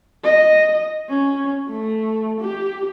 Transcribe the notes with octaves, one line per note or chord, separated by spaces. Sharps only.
D#5
C#4
A3
G4